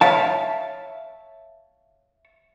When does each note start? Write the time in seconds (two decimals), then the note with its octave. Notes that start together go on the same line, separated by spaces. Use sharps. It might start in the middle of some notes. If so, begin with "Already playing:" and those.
0.01 C#5 E5 F5 A5